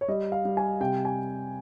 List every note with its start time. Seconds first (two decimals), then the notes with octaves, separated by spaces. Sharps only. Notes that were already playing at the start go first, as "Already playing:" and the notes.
0.01 C#5
0.08 G3 D#5
0.32 F5
0.45 G3
0.57 G#5
0.80 C3 G5
1.05 G#5